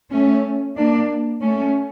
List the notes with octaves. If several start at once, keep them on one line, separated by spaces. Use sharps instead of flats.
A3 C#4
A#3 D4
A3 C#4